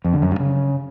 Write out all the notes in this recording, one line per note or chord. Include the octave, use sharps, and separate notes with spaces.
F2
D3
F#2
G2
C#3